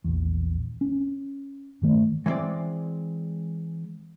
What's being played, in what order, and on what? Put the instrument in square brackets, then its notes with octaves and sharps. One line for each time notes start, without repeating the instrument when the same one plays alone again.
[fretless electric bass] A#1 E2
C#4
G2 D#3 A3
[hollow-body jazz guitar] E3 G#3 A#3 C4 D5